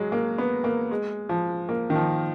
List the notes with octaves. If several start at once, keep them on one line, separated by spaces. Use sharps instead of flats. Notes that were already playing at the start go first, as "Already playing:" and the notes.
Already playing: F#3 G#3
A#3
B3
A#3
G#3
F3
A#3
D#3
F3